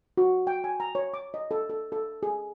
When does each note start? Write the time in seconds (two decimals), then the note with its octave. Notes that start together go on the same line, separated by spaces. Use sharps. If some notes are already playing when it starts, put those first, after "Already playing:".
0.17 F#4
0.47 G5
0.64 G#5
0.80 A#5
0.95 C#5
1.14 D6
1.34 D#5
1.51 A4
1.70 A4
1.92 A4
2.23 G#4